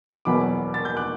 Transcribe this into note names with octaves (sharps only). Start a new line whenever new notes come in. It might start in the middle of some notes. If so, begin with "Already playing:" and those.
E1 E2 B2 F#3 B3 B5 D6
A6
G6
D6 F#6